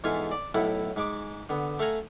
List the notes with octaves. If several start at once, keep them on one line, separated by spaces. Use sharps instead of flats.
E2 G#2 F4 A4 F5 G#5
D5
B1 A2 E4 A4 F#5
G#2 G#3 D6
D3 B3
A3 A4 F5 F#5 G#5 A#5